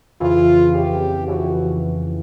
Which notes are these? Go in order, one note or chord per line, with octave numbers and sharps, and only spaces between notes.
F2 C#3 E3 F4
F2 C#3 E3 G4
F2 C#3 E3 F#4